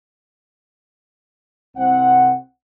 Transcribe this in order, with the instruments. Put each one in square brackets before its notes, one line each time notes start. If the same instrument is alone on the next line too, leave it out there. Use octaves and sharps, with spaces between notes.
[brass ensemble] C2 C4 F#5